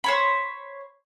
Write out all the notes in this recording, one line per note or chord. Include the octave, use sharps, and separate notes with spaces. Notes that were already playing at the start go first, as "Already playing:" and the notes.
C5 C#5 B5